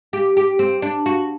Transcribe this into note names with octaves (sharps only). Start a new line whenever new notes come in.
G4
G4
C4
D4
F#4